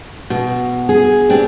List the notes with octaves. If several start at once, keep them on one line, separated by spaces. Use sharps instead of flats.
B2
G#4
C4 D4 G4